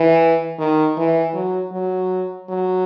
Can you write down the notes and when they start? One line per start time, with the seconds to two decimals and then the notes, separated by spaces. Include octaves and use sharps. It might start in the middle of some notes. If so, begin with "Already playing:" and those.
Already playing: E3
0.59 D#3
0.97 E3
1.34 F#3
1.72 F#3
2.49 F#3